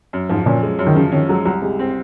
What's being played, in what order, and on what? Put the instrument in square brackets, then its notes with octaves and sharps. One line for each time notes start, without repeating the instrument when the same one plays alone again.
[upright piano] F#2
[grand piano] G#2 [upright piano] F3
[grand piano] A#2 [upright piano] C#4
[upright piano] G#3
F#2
[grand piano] D#3
[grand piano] C#3 [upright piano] F3
[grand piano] D#3 [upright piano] C#4
[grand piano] F#3 [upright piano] G#3
[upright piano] C2 [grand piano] F#3
[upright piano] C3 [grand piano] G#3
[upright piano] C4